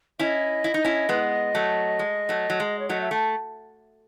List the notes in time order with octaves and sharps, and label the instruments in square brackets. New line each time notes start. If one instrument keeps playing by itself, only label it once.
[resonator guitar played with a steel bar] C#4 E4 [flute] D#5
[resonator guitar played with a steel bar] E4
D#4
C#4 E4
G#3 B3
F#3 A3
G#3
F#3 A3
F#3
G#3
[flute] C#5
[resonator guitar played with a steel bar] F#3 A3 [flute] D#5
[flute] E5
[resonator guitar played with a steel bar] A3